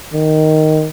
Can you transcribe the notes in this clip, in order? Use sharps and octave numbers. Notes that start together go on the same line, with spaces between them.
D#3